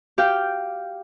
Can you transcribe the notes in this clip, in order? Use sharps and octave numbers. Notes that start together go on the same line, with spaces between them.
G4 F5 G5